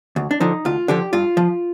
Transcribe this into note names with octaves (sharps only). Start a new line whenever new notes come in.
D2
D4
D3 F3 D#4
D2 F4
D3 F3 G4
G2 F4
F3